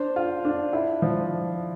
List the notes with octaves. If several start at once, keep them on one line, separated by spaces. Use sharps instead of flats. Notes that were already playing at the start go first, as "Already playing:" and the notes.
Already playing: D4 C5
F4
D4
E4
F3